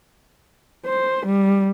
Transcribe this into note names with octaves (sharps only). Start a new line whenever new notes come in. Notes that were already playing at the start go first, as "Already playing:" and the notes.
C5
G3